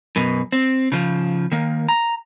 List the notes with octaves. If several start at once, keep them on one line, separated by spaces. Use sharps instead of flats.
F#2 B2
C4
C#3 F3
D#3 A#3
A#5